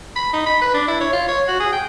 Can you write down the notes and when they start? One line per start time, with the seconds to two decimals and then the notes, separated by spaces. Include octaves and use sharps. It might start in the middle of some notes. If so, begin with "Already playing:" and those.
0.16 B5
0.33 D#4
0.46 B5
0.62 B4
0.74 D4
0.88 E4
1.01 C#5
1.13 F4
1.28 C#5
1.48 F#4
1.60 G#4
1.72 G5